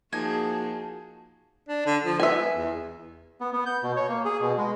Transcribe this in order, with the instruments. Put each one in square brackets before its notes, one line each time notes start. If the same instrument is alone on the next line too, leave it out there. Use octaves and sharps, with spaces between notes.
[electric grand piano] F3 A#3 D#4 [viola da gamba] F#4 G#4 [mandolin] G#5 [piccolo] A5
[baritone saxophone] D4
D3
F3
[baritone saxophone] B3 [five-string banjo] E5 G#5
[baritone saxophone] E2
[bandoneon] B3
B3
G6
B2
C#5
A#3
G#4
B2
G#3